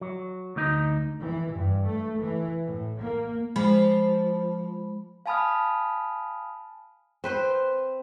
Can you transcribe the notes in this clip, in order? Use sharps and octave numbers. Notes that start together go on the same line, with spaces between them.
F#3
D2 D#4
E3
G2
A3
E3
A2
A#3
F3 G#3 B5
F5 G#5 A5 B5 D#6 F6
C4 B4 C5